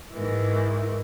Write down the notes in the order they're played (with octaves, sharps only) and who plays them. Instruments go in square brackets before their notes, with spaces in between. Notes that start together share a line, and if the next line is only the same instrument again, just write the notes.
[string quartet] G#2 D#3 E3